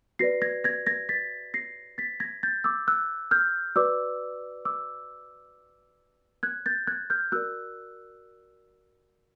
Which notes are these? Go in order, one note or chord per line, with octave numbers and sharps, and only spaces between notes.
F#4 B4 D5 A#6 C7
G#6 A#6
G#6 A#6
G#6 A#6
A6 B6
A#6 C7
A6 B6
G#6 A#6
G6 A6
D6 E6
E6 F#6
F6 G6
F#4 B4 D5 D6 E6
D6 E6
F#6 G#6
G6 A6
F#6 G#6
F6 G6
F#4 A#4 D5 E6 F#6